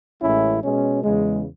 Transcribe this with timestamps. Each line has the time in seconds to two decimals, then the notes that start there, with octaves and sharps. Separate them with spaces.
0.21 A1 A2 G#3 C#4 E4
0.63 B2 G#3 C#4
1.04 E2 C#3 G#3